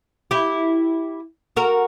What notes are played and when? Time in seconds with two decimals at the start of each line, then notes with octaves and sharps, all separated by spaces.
0.31 E4 G4
1.56 F#4 A#4